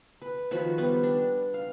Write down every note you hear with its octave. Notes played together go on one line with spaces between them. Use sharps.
B4
D#3 F3 F#4 B5
G3 B3 B4
D4
F5